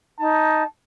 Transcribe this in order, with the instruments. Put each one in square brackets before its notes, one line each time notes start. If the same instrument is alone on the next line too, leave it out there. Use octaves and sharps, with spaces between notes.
[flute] D#4 [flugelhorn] A5